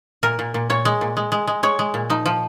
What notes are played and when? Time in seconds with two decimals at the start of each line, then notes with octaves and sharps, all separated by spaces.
0.23 A#2 A#4
0.39 A#2
0.54 A#2
0.70 A#2 C#5
0.85 G#3
1.01 A#2
1.17 G#3
1.32 G#3
1.47 G#3
1.63 G#3 C#5
1.79 G#3
1.94 A#2
2.10 F3 D#4
2.26 F3